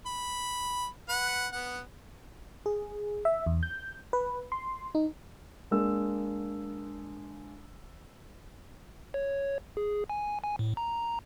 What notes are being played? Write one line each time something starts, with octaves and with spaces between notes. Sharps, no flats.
B5
B4 F#5
B3 F#5
G#4
E5
E2
G6
B4
C6
D#4
G#3 A#3 D4 E6
C#5
G#4
G#5
G#5
A2
A#5